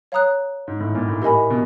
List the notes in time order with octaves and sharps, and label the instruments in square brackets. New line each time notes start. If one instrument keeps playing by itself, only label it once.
[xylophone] C#5 F5 A#5 D#6 F#6
[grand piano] G#2
A2
A#2
A2
[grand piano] A2 [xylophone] G4 A#4 D#5 G#5 B5
[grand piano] B2